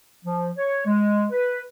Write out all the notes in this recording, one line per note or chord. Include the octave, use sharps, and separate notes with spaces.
F3
C#5
G#3
B4